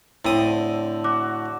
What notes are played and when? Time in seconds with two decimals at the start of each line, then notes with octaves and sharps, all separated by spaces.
0.25 A2 D3 C4 D#6
1.04 F#4 D6